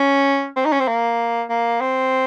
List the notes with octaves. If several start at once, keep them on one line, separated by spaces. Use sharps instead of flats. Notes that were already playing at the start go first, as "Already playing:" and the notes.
Already playing: C#4
C4
D#4
C#4
C4
A#3
A#3
C4